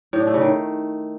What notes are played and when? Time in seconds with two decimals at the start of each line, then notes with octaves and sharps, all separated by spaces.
0.13 A2
0.20 D4
0.27 A3
0.34 C#3
0.41 D#3